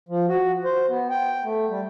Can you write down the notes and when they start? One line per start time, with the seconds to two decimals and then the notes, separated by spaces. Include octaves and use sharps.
0.09 F3
0.29 F#4
0.64 C5
0.89 B3
1.10 G5
1.44 A3
1.70 G3